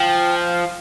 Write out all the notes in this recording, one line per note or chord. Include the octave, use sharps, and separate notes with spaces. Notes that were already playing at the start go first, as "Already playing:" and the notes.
Already playing: F3 G5
F5